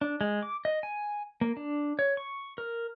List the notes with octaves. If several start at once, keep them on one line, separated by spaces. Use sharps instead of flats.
D4
G#3
D6
D#5
G#5
A#3
D4
C#5
C#6
A#4